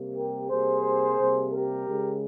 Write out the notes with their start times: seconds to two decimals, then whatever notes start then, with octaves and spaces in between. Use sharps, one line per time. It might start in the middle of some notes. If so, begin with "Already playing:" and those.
Already playing: C3 G3 A#3
0.14 G4 A#4
0.49 C3 G3 A#3 G#4 C5
1.17 C3 G3 A#3
1.52 G4 A#4
1.87 C#3 G#3